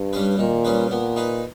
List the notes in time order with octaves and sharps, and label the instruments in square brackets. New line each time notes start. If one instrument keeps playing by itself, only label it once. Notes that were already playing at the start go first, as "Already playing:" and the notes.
Already playing: [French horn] G2
[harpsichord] G3 C#4 G#4 B4
[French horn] A#2 [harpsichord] D#3
[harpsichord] G3 C#4 G#4 B4
[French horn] A#2 [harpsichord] B3
[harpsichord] D#4 G#4 B4